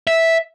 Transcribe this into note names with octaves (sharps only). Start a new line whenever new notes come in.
E5